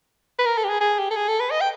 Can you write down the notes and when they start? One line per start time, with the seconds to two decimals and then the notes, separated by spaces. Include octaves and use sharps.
0.39 B4
0.45 A#4
0.58 A4
0.64 G4
0.69 G#4
0.81 G#4
0.99 G4
1.11 A4
1.16 G#4
1.28 A4
1.40 B4
1.51 D#5
1.61 G5